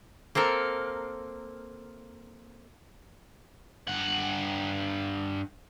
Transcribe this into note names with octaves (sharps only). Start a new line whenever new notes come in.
A#3 C4 A4 A#4
G2 F#5